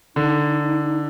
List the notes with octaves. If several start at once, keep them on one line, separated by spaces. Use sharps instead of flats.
D3 D#4